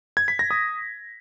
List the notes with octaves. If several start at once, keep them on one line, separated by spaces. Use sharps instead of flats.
G#6
B6
A#6
D#6